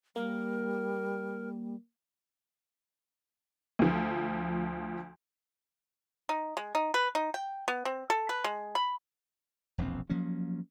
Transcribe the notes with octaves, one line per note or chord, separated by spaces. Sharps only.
G3 A#3 A#4
D2 F3
D#4
G#3
D#4
B4
D#4
G5
B3
C4
A4
B4
G#3
B5
E1 A#1 F2 C4
F3 F#3 A#3 C#4